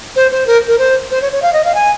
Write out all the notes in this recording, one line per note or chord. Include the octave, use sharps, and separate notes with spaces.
C5
C5
A#4
A#4
C5
C5
C#5
C#5
F5
D#5
F5
G#5